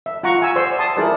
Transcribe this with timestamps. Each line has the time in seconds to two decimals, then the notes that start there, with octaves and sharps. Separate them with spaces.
0.06 E5
0.23 F4 F#5 A#5 C#6
0.40 E5 G#5 E6
0.56 C5 D5 C6 E6
0.79 A5 C6 D#6
0.97 E4 G#4 A#4 D5